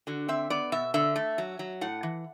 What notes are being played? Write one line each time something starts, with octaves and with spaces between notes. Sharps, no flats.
D3 F#4
C4 E5
B3 D5
B2 E5
D3 E5
A3
F#3
F#3
A2 F#5
E3